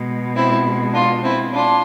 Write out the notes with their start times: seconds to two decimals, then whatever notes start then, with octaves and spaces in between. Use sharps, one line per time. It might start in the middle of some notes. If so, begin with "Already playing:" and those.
Already playing: B2 G#3
0.35 C4 E4
0.93 D4 F4
1.23 C4 E4
1.52 D4 F4